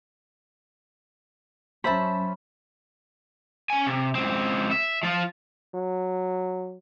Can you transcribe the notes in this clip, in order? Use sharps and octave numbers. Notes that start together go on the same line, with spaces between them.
F#3 C#4 C5 E5 A5 B5
C#4 G#5
C3
C#2 C4
E5
F3 F4
F#3